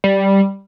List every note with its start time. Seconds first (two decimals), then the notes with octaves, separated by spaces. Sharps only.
0.04 G3